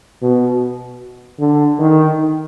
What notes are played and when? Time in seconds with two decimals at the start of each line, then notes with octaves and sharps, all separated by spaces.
0.22 B2
1.39 D3
1.79 D#3